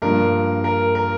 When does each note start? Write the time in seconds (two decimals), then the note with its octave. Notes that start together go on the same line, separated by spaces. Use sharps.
0.02 G2 F3 A#3 A#4
0.64 A#4
0.95 A#4